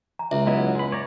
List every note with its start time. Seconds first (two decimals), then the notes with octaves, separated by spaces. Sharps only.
0.19 A#5
0.31 C#2 E5
0.47 F#3 B3 E4 D#5
0.75 G#3 B5
0.92 C#5 D5 A#5